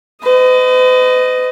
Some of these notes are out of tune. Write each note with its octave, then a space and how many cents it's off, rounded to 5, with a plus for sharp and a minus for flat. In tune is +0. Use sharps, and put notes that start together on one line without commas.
B4 +45 D#5 +0